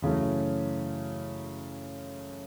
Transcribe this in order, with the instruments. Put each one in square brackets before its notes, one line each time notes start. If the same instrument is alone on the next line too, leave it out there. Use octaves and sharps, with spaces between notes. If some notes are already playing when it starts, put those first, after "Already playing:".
[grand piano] F#2 C#3 E3 A3